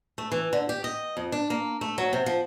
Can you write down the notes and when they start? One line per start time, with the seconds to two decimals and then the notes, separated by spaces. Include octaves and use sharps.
0.18 A3
0.32 E3
0.53 D3
0.69 G4
0.84 D#5
1.17 F2
1.32 D4
1.50 A#3
1.81 A3
1.98 F#3
2.13 C3
2.26 F3